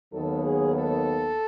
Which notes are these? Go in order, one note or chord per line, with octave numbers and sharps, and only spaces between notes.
D#2 D#3 F#3 B3 A4
G#4
A4